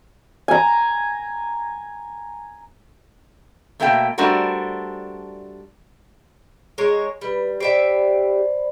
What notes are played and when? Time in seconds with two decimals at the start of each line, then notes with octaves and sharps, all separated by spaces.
0.48 G#5 A#5
3.80 B2 A3 A#3 E5 G5
4.18 G3 A3 D4 F#4 A#4 C5
6.78 G#3 A#4 C#5
7.21 G3 B4 B5
7.60 G4 C5 D5 E5 G5 B5